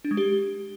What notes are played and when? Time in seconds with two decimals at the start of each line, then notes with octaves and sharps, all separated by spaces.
0.05 D4
0.11 G#3
0.17 G4